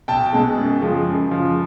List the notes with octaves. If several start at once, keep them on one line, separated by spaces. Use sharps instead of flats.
B1 G5 A5
B2 G#3
F#2
C#3 F3 G#3
F#2
C#3 F3 G#3